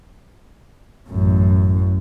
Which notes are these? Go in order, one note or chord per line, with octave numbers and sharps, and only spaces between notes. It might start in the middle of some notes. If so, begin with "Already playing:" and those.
A1 F#2